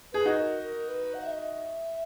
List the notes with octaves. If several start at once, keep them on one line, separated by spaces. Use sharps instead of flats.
G#4 B4
D#4 F#4
A#4
A#4
B4
F#5
E5
D#5
E5